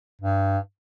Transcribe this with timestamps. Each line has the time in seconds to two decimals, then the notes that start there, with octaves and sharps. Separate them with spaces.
0.22 G2